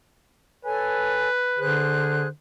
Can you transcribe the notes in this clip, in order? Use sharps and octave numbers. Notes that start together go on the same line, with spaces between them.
A4 B4 C#5 G#5
D3 G#4 C5 F#6